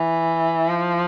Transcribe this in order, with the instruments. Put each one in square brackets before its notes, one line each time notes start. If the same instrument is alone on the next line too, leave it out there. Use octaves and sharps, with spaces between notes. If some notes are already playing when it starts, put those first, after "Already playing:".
Already playing: [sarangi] E3
F3